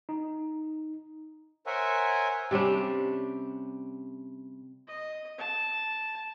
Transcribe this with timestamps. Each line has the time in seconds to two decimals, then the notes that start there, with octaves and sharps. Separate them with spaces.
0.09 D#4
1.67 A#4 C5 C#5 E5 F#5 G#5
2.51 C3 G3 C#4 D4
4.88 D#5
5.38 A5